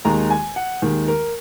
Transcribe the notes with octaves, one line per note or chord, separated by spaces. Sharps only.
D#2 D#3 G#3 A#5
G#5
F#5
D#2 D#3 G#3
A#4